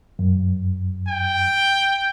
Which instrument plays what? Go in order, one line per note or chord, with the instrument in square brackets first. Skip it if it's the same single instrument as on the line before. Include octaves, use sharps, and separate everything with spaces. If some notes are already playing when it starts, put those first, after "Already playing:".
[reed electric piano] F#2
[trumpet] G5